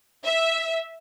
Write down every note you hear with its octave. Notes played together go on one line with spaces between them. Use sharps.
E5